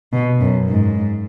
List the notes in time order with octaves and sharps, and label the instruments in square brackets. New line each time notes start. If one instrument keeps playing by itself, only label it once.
[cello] B2
F#2
G#2